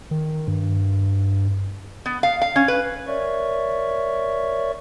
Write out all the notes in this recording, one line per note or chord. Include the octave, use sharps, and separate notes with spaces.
D#3
G2
B3
F5
F5
C#4
B4
A#4 C#5 D5 E5 C#6